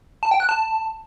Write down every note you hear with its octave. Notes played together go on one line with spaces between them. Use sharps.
A5
G5
F#6
A5